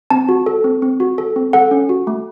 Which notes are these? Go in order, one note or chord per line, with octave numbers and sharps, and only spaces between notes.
C4 A5
F#4
A4
C4
C4
F#4
A4
C4
A4 F#5
C#4
F#4
A3